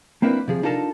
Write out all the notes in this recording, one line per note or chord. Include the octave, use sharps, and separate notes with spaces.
A#3 C4 D4 E4 A#4 B4
C3 F3 G#4
D4 D#4 F4 A4 A#4 A5